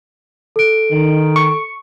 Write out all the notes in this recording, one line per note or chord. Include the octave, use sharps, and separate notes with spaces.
A4 D7
D#3
C#6